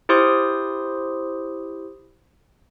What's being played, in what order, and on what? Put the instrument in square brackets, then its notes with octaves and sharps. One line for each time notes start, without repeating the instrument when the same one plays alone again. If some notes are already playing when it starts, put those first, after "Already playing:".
[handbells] E4 G4 C5 C6 D#6